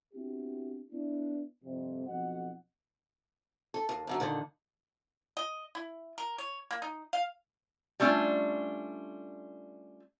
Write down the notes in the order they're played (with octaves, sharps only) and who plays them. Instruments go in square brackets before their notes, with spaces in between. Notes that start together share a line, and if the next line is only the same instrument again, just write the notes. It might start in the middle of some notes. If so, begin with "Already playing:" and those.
[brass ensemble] B3 C4 D4 E4 F#4 G4
B3 D4 E4
G1 F2 C3
B1 F2 B3 F#4 D#5 F#5
[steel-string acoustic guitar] A4
D#2
F#2 D3 F#3
A#2 D3 D#3
[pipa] D#5
E4
A#4
C#5
A#3
D#4
F5
[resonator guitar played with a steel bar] G3 A3 C#4 D4 F4